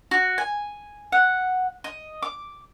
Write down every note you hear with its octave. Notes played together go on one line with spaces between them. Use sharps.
F#4
G#5
F#5
D#5
D6